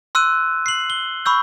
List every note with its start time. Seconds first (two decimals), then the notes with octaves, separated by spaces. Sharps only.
0.15 C6 E6 F#6 D#7
0.66 C7 F#7
0.90 G7
1.25 B5 C#6 E6 G6